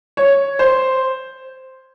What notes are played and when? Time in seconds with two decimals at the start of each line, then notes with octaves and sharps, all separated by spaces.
0.17 C#5
0.59 C5